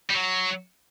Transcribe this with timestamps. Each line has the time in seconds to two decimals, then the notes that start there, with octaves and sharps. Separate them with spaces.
0.10 G3
0.14 F#3